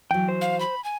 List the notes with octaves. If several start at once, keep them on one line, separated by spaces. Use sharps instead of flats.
E3 F#3 G5
C5
F5
B5
G#5